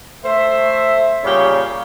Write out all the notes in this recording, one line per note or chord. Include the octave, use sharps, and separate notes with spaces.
A3 C5 E5
A#2 C#3 G3 G4 C#5 F5